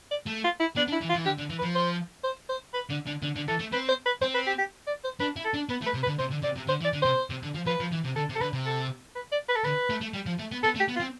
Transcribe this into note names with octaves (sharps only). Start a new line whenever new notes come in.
D5
A3
F4
E4
B3 D4
D4
E4
E3
F4
E3
D3 G4
D3
E3
B4
F3
C5
C5
C5
B4
D3
D3
D3
D3
E3 A4
A3
C4 B4
C5
B4
C4 C5
B4
G4
G4
D5
C5
D4 B4
E4
A4
D4
B3 B4
A3
B4
C3
B4
D3
C3 C5
D3
C3 D5
C3
D3 C5
E3
D5
D3
C3 C5
C3
D3
F3
F3 B4
F3
E3
C3
D3 A4
C3
A4
D3 B4
C3
A4
B4
D5
B4
A4
D3 B4
A3
A3
G3
F3
A3
B3
B3 A4
A3
G4
B3
F4
C4